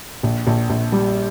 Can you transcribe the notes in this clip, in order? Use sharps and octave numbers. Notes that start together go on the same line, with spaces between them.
A#1
A#1
A#1
G3